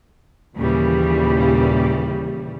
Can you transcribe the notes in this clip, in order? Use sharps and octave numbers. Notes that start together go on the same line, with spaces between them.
D#2 A#2 C#3 E3 G3